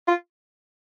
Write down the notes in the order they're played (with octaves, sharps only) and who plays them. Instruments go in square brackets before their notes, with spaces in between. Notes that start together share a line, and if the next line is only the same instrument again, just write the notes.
[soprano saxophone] F4